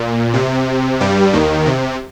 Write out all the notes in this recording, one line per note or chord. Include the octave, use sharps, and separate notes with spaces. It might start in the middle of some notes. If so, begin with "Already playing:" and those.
Already playing: A#2
C3
G2 G3
D#2 D#3
C3